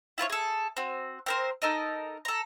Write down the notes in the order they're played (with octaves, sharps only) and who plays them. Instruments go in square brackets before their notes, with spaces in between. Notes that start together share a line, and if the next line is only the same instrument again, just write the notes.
[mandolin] E4 F4 B4 C#5
G#4 A4
C4 F#4
C4 A#4 C5
D#4 A4 A#4 D#5
A4 A#5